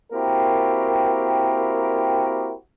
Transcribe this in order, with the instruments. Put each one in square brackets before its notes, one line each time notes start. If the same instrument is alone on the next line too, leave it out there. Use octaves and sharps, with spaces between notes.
[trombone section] A#3 C4 E4 F#4 G4 A#4